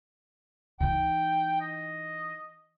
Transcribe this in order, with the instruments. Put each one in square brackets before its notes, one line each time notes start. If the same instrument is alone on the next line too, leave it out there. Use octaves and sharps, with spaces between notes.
[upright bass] E3 D#4 [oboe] G5
[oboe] D#5